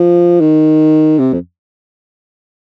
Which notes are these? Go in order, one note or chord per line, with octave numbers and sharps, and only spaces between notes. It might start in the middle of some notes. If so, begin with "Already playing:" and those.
Already playing: F3
D#3
C3
F2